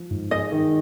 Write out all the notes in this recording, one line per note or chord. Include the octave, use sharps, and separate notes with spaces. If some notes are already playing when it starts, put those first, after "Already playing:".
Already playing: F3
G#2
G#4 D#5
D#3